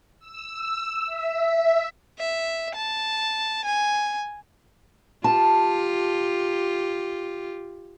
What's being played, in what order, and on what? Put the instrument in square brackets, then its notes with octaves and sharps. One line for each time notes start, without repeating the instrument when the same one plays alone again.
[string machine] E6
E5
[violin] E5
A5
G#5
[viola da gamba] F4 G4 [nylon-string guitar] A5